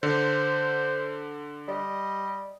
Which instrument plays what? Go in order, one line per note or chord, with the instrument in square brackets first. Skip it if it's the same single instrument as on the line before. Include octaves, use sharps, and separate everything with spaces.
[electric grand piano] D3 [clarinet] C5
[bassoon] G3 [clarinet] D#5